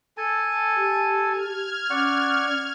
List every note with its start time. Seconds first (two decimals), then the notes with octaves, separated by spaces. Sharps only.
0.17 A4 G#5 A5
0.76 G4
1.26 F6 G#6
1.90 C#4 D5 F#5 C#6